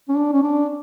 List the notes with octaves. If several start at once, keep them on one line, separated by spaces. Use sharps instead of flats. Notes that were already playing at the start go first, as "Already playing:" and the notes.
C#4
D4
C#4
D4